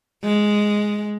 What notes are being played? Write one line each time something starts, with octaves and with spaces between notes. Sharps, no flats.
G#3